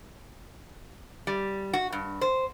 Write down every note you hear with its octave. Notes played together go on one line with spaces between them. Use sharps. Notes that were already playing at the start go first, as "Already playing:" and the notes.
G3
F#4
G2
C5